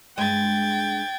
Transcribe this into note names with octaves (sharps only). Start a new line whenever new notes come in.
G2 G#3 D#5 G5 G#6 A6